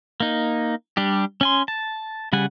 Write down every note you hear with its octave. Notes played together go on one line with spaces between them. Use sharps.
A#3 D#4
G3 D4 G4
C#4 G#5 C6
A5
C#3 G3 F#5 G#5